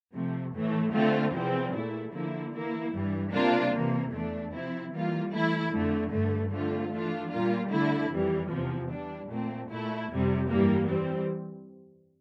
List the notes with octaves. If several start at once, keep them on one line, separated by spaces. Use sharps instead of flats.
C3 F3 A3
A2 E3 A3
D3 A3 C4 F4
E2 C3 F3 C4
A#2 A3 E4
D3 F3 A#3 E4
E3 A#3 E4
G2 E3 G3
C3 G3 A#3 D4 F4
C3 E3 A#3
E2 E3 A3 D4
C3 F3 C4 E4
E3 G3 A#3 F4
E3 A3 E4
F2 D3 A3
G2 D3 A3
D3 A3 C4 F4
E3 A3 D4 F4
A#2 G3 A#3 F4
D3 A3 E4
F2 E3 G3
E2 C3 F3
E3 G3 D4
A#2 A3 C4
A#2 A3 E4
F2 C3 G3
G2 E3 G3 A#3
E3 G3 C4